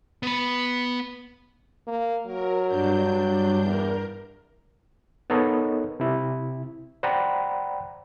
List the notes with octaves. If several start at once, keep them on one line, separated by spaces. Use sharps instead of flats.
B3 B5
A#3
F#3 A#4
G2 D4 G6
E2 A#4
B3 D#4 A4 A#4 C#5 D#5
C3 E4
C5 D5 F#5 G5 A#5 B5